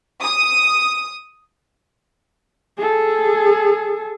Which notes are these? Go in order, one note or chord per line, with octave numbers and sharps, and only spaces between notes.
D#6
G#4 A4